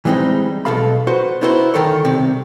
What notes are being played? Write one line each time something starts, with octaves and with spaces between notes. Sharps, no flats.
E3 G3 G#3 C4 D#4
B1 B2 A4 F5 B5
F#4 B4 C5
B3 D#4 E4 F#4 G4 C5
D2 G#2 D#3 A4 A#4 C#5
C2 C3